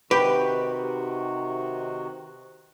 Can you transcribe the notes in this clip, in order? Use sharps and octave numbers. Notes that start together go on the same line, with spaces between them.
C3 D#3 F#4 G4 B4